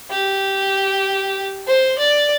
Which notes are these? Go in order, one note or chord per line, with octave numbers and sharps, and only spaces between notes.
G4
C5
D5